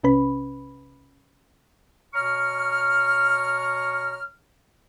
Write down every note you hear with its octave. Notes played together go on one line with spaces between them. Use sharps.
B1 C3 C#4 B4 B5
B2 C#5 A#5 C#6 F6